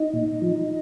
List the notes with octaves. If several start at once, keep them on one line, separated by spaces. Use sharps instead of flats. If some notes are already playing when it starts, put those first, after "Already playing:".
Already playing: D#4
A#2
F3